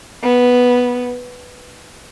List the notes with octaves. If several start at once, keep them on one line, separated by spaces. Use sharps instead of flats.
B3